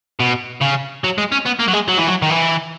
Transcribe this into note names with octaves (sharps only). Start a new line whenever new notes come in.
B2
C#3
F#3
G#3
C#4
B3
A#3
F#3
G#3
F#3
E3
F#3
D#3
E3